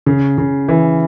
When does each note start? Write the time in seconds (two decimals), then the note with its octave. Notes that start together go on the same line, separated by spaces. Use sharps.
0.06 C#3
0.38 C#3
0.68 E3